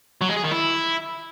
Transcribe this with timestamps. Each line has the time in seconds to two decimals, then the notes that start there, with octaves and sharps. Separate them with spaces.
0.21 F#3
0.29 G#3
0.37 G#4
0.44 D#3
0.52 E4